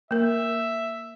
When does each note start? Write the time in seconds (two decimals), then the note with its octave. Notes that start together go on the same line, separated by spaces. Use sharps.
0.11 A#3 A#4 E5